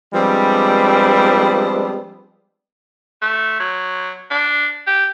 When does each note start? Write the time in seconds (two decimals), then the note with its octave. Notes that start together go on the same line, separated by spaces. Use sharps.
0.14 F3 G3 G#3 B3 C4 D4
3.22 A3
3.60 F#3
4.31 D4
4.87 G4